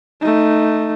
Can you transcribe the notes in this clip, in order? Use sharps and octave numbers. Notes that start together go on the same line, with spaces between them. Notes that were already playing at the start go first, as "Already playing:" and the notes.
A3 D#4